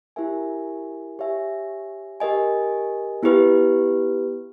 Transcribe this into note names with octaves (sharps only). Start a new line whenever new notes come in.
E4 G4 A#4 E5 G#5
G4 C#5 E5 G#5
G4 A#4 D#5 G#5
B3 E4 G4 B4